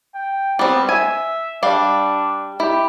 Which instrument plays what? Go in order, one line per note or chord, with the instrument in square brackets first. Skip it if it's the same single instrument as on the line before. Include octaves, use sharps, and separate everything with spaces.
[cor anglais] G5
[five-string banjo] G3 C4 [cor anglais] B3
[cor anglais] E5 [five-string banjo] G#5
[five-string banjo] G3 F5 [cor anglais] D4
[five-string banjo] E4 [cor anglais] G4